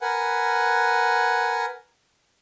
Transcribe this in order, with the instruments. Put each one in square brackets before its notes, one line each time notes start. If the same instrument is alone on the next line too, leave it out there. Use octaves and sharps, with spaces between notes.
[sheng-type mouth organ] A#4 B4 F#5 G#5